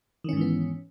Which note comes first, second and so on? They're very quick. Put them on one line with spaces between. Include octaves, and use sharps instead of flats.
D#3 C#4 G#2 E3 B3